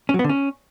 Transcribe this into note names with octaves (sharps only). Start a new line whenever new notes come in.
C#4
F#3
B3
D3
C#4